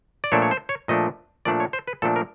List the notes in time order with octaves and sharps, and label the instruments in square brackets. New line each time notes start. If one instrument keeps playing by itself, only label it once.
[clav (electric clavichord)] D5
A#2 F3 A3 D4 C#5
C#5
C5
C#5
A#2 F3 A3 D4 D#5
A#2 F3 A3 D4 D5
C#5
C5
B4
A#2 F3 A3 D4 A4
A#4